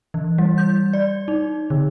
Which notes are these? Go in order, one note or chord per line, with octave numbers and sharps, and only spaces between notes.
E3
G3
G6
D5
D#4
D3